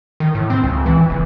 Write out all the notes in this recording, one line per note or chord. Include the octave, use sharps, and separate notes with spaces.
D#3
A2
C4
C#2
E3
F#1